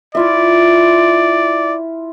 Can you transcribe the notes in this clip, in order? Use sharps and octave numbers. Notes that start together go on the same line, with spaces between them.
E4 F4 D5 E5